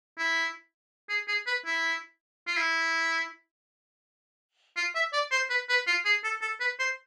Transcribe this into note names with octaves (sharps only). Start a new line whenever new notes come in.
E4
G#4
G#4
B4
E4
F4
E4
F4
E5
D5
C5
B4
B4
F4
G#4
A4
A4
B4
C5